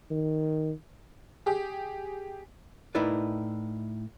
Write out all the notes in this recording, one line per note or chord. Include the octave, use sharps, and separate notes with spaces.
D#3
G4 G#4
A2 D#4 E4 A#4 B4 D5